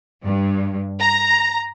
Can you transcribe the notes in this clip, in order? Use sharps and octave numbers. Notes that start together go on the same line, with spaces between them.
G2
A#5